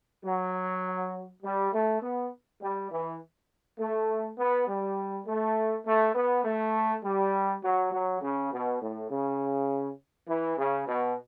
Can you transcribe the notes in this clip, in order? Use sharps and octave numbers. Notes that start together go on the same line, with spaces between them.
F#3
G3
A3
B3
G3
E3
A3
B3
G3
A3
A3
B3
A3
G3
F#3
F#3
C#3
B2
A2
C#3
E3
C#3
B2